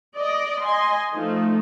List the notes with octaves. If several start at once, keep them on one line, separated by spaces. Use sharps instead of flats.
D5 D#5
D#5 G#5 C6
F3 A3 D#4